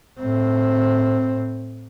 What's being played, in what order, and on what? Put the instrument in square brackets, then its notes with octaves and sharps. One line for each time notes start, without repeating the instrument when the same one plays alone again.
[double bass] A2 C4